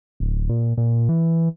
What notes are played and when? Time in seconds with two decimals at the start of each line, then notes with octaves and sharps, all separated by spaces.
0.20 D1
0.49 A#2
0.78 A#2
1.09 E3